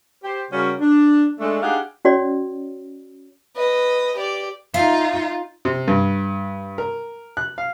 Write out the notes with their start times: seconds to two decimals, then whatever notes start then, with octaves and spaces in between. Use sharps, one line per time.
0.23 G4 C5
0.51 C#3 G3 C#4 F#4 G4 A#4
0.80 D4
1.40 G#3 A3 D4
1.62 D4 D#4 G4 G#4 F5 F#5
2.05 C#4 F#4 C#5 D5
3.57 B4 D#5
4.15 G4 D5
4.74 D#4 F4 E5 F5
5.65 C3
5.88 G2
6.78 A#4
7.37 F#6
7.58 F5